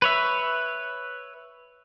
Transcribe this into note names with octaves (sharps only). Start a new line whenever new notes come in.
B4 C#5 E5